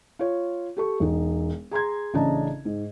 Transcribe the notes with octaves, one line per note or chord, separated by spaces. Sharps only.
F4 C#5
G4 A4 C#6
E1 D#4
G#4 A#5 C6 G#6
A1 C#3 D4 D#5 A5 A#5
G#2